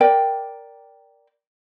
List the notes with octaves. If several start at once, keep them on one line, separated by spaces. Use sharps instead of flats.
A#4 D5 G5